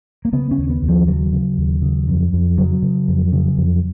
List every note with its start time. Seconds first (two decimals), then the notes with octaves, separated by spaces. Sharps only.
0.25 A#3
0.33 C#3 B3
0.51 C#4
0.58 D#2
0.70 B3
0.82 D#2
0.89 F3
1.07 C#3 F#3
1.33 C#3
1.57 D#2
1.82 C#3
2.08 F2
2.33 F2
2.57 C#3 F#3
2.82 C#3
3.08 F2
3.33 C#3
3.58 F2